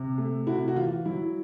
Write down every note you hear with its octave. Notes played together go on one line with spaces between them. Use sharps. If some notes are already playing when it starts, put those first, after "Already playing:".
Already playing: C3
A3
C3 E4 F#4
F#4
E3 F4
F#3 E4